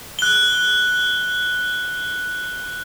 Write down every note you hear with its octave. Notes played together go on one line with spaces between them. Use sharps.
F#6 G7